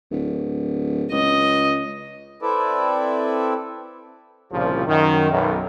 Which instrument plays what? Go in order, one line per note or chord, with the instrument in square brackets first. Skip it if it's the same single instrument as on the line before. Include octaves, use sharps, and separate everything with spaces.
[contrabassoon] D1
[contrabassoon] C#2 [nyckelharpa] D#5
[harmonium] C4 E4 A4 B4 D5 E5
[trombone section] C2 A#2 C#3 F3 G3
F#2 D#3
B1 F#2